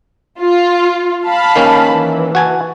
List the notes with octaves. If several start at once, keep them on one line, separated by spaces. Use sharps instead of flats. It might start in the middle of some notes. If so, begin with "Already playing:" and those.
F4
F5 A5 B5
D#3 A#3 C#4
E3
F#4 G#5 A5